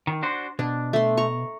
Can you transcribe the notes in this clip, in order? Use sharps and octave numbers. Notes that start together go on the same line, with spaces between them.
D#3
D4 F#4 C5
B2 D4
A3 C6
A#5 C#6